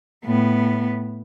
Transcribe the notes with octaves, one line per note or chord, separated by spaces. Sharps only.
A2 B3